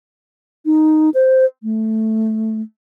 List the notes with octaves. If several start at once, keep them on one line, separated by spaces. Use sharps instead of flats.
D#4
C5
A3